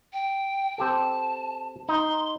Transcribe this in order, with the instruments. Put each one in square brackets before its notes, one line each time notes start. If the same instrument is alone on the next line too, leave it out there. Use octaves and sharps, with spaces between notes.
[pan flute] G5
[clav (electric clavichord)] C4 G4 A4 [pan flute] A5
[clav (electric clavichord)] D#4 [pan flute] C6